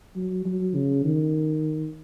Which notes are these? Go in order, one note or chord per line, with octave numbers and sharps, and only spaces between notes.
F#3
F#3
C#3
D#3